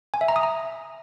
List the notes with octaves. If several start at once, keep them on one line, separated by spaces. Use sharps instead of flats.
G#5
E5
A#5
D#6
A#5